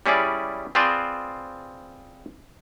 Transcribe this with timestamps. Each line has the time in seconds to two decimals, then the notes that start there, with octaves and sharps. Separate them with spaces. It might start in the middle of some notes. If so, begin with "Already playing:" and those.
0.06 G3 C#4 E4 G#4 D5
0.75 C4 F4 G#4 B4 C5 D5